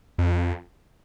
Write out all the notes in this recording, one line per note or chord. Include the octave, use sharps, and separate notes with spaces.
F2